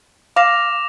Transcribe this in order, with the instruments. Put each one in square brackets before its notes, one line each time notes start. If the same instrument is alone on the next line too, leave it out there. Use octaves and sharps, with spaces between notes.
[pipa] F5 [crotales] D6 A#6 F7